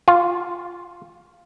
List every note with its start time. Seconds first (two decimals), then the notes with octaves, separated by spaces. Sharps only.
0.08 F4